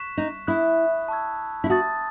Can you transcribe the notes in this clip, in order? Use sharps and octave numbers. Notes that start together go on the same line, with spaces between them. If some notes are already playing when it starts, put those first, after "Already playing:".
Already playing: C#6 F#6 B6 E7
D#4
E4 B5 D#6 F#6
A5 C#6 E6 G#6
E4
F#4 A5 D#6 A6